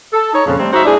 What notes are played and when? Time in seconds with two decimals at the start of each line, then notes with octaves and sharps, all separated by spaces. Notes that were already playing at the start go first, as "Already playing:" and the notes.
0.13 A4
0.33 D#4 C#5
0.46 F2 A#2 C#3
0.59 G3 A3 C4
0.73 D#4 F#4 C5 E5
0.85 G#3 D4 E4 G#4